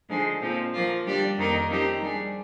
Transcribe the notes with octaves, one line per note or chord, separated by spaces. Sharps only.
D3 F3 G#3 D#4 G#4
A#2 F3 C4
F3 A#3 F4
D3 G3 D4 G4 D5
F2 D#3 A#3 D#4 A#4
F3 C4 D#4 G4 A#4
G3 D4 G#4